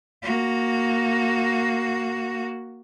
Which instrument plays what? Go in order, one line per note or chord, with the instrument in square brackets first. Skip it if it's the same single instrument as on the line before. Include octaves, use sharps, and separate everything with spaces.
[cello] A#3 F#4